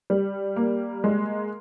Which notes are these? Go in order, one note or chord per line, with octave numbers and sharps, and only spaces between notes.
G3
A#3
G#3